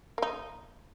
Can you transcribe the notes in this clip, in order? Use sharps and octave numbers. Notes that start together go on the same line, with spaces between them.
A#3 D#4